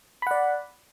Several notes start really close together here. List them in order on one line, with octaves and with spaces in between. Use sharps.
B5 F#5 D5